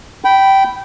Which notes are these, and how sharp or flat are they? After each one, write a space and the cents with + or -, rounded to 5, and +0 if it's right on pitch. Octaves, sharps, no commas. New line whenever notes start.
G5 -15 B5 +0